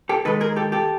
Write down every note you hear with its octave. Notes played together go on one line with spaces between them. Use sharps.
G4 A4
D#3 G#3 A4 B4
G#4 A#4
G4 A4
G4 A4